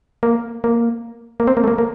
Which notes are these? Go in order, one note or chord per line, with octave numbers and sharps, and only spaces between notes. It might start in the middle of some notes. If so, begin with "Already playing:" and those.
A#3
A#3
A#3
C4
A#3
A3
A#3
A#3